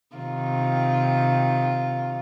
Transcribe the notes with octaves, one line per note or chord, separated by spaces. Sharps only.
C3 D#3 F4